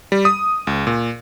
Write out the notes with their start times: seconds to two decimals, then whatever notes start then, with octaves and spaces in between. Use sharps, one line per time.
0.12 G3
0.25 D#6
0.67 C#2
0.87 A#2